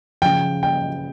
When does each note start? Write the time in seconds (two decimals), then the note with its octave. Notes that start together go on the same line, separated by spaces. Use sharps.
0.22 C#3 F3 G5
0.63 G5